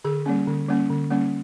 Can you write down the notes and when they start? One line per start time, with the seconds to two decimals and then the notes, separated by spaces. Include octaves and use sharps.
0.05 D3 G#4
0.26 G3 A#3 C#4
0.48 D3
0.69 G3 A#3 C#4
0.90 D3
1.11 G3 A#3 C#4